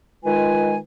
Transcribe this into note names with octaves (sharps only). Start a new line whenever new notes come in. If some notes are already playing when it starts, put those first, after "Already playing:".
D#3 G#3 F4 B4 G#5